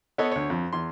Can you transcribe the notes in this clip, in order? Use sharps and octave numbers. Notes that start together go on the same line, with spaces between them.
B3 A4 B4 C#5 D#5
D2 C#5
F2
E2 C6